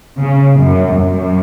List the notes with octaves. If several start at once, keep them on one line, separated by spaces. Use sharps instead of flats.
C#3
F#2
F#2